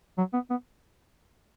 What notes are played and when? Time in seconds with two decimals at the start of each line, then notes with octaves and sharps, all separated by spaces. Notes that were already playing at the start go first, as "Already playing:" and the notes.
0.18 F#3
0.33 B3
0.50 B3